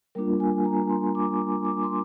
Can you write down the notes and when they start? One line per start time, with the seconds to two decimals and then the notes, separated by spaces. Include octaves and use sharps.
0.15 G3 A#3 D4 F4 A#4
0.40 G#5
0.65 A#5
0.90 C6
1.15 D6
1.65 D6
1.84 C6